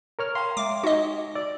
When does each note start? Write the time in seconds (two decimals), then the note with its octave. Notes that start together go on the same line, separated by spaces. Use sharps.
0.19 A#4 C#5 F6
0.35 F5 G5 A#5 C6
0.57 G#3 E5 D6
0.83 D#4 F#4 D#5
1.35 D5 E6